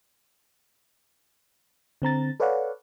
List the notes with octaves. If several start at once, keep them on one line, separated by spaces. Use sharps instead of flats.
D3 C4 A#5 A6
A4 B4 C#5 D5 F5 F#5